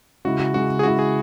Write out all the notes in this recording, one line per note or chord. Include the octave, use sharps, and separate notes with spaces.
C#3 G#3 E4 F#4
F#4
C#3 G#3 E4 F#4
G#4
C#3 G#3 E4 F#4
G#4